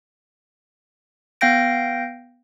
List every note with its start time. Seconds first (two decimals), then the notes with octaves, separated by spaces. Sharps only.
1.41 B3 F5 G5 G6 A#6 D7